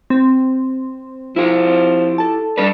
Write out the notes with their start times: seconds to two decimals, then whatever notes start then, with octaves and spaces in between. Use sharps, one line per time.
0.10 C4
1.36 F3 E4 G4
2.18 A4 A5
2.58 G3 D4 B4 D5